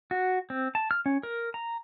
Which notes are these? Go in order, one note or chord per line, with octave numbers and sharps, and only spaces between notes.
F#4
C4
A5
F6
C#4
A#4
A#5